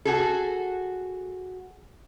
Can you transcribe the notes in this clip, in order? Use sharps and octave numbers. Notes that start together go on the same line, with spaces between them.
F#4 G#4 A4